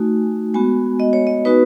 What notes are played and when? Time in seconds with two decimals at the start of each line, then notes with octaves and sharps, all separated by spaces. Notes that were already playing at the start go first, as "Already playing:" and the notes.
Already playing: A3 D#4 F#4 G#5
0.54 G#3 B3 F#4 G#5
1.00 D#5
1.13 C#5
1.27 D#5
1.45 B3 D#4 F#4 B4